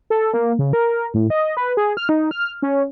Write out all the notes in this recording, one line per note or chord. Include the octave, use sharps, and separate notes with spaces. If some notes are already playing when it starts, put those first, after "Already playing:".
A4
A#3
C#3
A#4
A2
D#5
B4
G#4
F6
D#4
F6
C#4